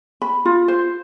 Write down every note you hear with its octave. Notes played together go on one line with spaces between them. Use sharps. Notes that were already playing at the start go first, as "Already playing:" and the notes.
B5
F4
C5